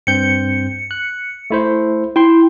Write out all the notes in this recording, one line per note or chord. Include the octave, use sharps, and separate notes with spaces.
G2 C4 G6 C#7
F#6
A3 E4 C5
E4 G5 C6